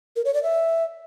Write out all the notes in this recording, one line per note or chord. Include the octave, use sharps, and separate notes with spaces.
A#4
C#5
D5
E5